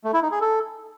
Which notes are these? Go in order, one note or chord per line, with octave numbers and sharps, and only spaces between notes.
A3
E4
D#4
G#4
A4